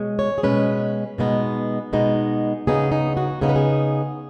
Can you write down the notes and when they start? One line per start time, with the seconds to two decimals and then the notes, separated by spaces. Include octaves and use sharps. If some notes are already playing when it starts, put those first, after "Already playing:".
Already playing: B2 G#3 C#4
0.19 C#5
0.38 G#4
0.43 B2 G#3 C#4 B4
1.18 B2 G#3 B3 D#4
1.93 B2 G#3 B3 D#4
2.67 C#3 B3 D#4 G#4
2.92 D#4
3.17 F#4
3.41 C#3 B3 D#4 G#4
3.49 B4
3.56 G#4